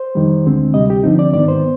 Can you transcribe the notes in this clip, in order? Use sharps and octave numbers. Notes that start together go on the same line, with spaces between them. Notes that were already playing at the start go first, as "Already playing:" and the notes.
Already playing: C5
F2 D#3 G3
D2 D3 G#3 C4
D2 C3 G3 D#5
G4
G2 D3 F3 C4 D#4
D5
G#2 D#3 B3 D5
C5